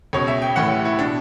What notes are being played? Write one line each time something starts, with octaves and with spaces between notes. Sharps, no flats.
C#2 B2 C#5
E5
G5
A1 A2 E3 F#5
G4
E4
B2 D4